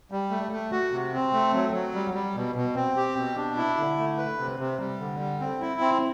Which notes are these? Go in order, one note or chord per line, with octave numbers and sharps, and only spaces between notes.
G3
A3
A3
F#4
C3
C4
A3
F#3
F#3
G3
G3
B2
B2
C4
G4
B2
D4
E4
D3
A3
B4
C3
C3
G3
D3
G3
C4
E4
C4